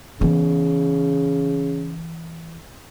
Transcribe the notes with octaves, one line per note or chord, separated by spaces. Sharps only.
C#3 E3 B3